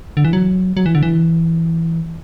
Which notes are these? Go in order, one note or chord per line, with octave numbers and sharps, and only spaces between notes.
D3
E3
F#3
F#3
E3
D3
E3